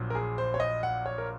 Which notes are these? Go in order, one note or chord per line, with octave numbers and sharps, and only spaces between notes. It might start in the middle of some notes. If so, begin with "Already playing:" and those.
Already playing: A#1 A#2 F#3
A#4
G#4
C5
C#5
D#5
F#5
C#5
A#4